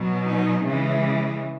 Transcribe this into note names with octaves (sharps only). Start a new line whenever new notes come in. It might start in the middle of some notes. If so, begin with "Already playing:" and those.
Already playing: B2 F#3
D#4
C#3 E3 G#3